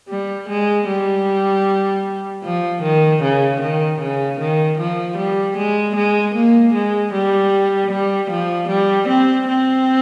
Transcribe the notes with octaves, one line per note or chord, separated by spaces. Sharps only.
G3
G#3
G3
F3
D#3
C#3
D#3
C#3
D#3
F3
G3
G#3
G#3
A#3
G#3
G3
G3
F3
G3
C4
C4